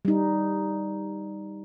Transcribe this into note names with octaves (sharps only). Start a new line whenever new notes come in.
G3 D#4